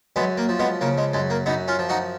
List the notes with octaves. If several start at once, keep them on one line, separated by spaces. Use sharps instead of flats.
F#2 G#3 B3
A#3
F3
G#3 B3
C#3 A#3
G#3
F#2 G#3
A#3
F#2 B3 D#4
C#4 F4
F3
D#4 F#4